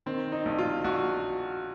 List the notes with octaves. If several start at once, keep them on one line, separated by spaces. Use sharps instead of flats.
D#3 C4
D#4
A#1
F4
A#1 F#4